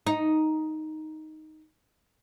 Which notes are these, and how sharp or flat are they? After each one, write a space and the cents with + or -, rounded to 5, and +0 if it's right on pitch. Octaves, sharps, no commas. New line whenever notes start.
D#4 +5